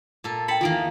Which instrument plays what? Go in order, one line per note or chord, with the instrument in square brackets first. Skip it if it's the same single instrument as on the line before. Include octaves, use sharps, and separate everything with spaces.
[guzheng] A#2 A4
[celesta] G5 C#7 [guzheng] A5 B5
[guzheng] E2 D#3 A#3 [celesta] F4 D7